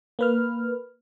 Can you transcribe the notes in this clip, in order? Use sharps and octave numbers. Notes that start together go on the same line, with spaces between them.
A#3 B4 F6